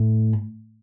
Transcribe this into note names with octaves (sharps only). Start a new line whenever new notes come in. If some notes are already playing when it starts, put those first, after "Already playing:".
Already playing: A2